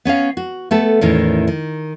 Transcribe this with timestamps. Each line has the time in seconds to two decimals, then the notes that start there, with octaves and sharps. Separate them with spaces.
0.05 B3 C#4 C#5 F5
0.37 F#4
0.71 A3 B3 A4
1.01 E2 A2 D#3 C#4
1.47 D#3